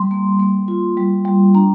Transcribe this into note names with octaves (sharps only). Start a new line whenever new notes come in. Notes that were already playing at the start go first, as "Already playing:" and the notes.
Already playing: G3 C6
A#3
A#3
F4
G3
G3
D4 A#5